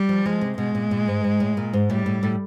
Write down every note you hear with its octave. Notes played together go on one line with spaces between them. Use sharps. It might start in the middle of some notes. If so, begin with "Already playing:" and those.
Already playing: G3
F3
F3 G#3
C3
B2 G#3
A#2
A#2
G#2
G#2
A2
A#2
G#2
A2 G3
A2
A2